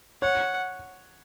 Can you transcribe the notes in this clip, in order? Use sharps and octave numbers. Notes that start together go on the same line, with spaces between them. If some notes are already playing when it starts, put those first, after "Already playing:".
C#5 F#5